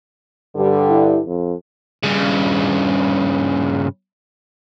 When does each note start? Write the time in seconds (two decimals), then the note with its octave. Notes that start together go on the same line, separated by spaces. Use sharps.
0.56 G2 D3 G3
0.89 E4
1.26 F2
2.03 G2 C#3